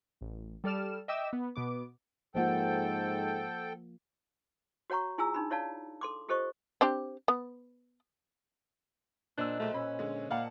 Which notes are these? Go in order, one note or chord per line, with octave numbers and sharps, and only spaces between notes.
A1
G3 A4 D5 F6 E7
D#5 E5 G5 D6 E6
B3
B2 B3 D6
G#2 F3 A#3 F4 A4 C5 F#5 G5
F#4 C#5 F#5 A#5 C#6
E4 F4 G#4 G#5 A#5 E6
D4 D#4 B5
E4 C#5 D5 F5 A5
A4 C6 D6
F4 G4 A4 C5 D#5 C#6
C4 D4 G4
B3
A#2 D4 C5 D#5 E6 F#6
B1 G#3 A3
C#4 B5
D3 G#3
A#2 D5 F5 F#5 A5